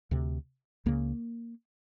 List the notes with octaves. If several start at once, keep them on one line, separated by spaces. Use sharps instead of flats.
D2 C3
C#2 C#3 A#3